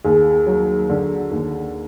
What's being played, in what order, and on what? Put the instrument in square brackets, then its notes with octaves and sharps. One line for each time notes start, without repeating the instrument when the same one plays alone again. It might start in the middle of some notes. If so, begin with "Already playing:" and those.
[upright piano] D#2 [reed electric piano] G#4
[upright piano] F#3
D3
D#2